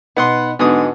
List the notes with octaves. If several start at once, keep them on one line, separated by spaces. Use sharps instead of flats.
B2 B3 D#4 F#5 C6
G#2 D3 B3 F#4 D#5 D#6